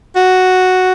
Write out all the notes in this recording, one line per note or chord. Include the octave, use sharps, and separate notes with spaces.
F#4